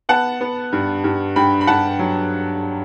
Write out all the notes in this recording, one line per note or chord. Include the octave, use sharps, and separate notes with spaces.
B3 F#5 A5
B3
G2
G2
G2 G5 B5
B5
G2 F#5 A5
F#3